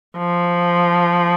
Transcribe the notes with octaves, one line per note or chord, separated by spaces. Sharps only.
F3